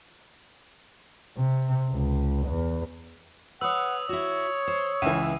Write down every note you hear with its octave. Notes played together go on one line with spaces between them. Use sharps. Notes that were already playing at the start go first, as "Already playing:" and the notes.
C3
C#2
E2
B4 C#5 F#5 D#6 E6
E4 F#4 C#5
C5
C#2 E3 E5 D#7